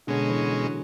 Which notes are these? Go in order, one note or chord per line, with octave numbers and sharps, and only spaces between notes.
B2 D3 G#3 C#4
E3
F#3